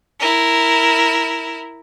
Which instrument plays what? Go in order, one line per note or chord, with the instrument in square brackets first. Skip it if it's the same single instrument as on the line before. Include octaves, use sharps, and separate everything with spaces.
[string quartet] E4 A#4